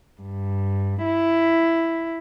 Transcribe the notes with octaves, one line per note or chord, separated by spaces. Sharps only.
G2
E4